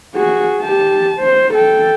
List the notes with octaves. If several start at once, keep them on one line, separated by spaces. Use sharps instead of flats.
F#4 G#4
G4 A5
C5
A4 G5